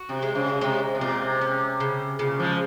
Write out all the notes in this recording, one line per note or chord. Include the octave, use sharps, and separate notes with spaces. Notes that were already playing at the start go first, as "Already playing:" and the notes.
Already playing: F#4
C3
G#3
C#3
C3 G#3
C3
A#2 C4
C3
C#4
C#3
A#2 C#3
F3 G#3